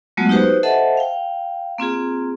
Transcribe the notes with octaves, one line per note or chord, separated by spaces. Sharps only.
F#3 G#3 A3 B3 F4 F#4
D#4 F#4 G4 B4 C5
A4 C5 D#5 E5 F#5 A5
F5 G5
A#3 C4 F4 G#4